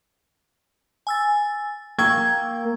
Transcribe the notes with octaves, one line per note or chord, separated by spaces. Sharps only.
G#5 E6 A6
A#3 G5 C#6 E6 G#6